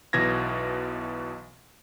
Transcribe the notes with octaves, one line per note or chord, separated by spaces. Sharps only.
B1 B2 E3 G#6 A#6